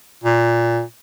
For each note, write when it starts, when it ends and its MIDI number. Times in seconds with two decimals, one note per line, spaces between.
0.24 0.82 46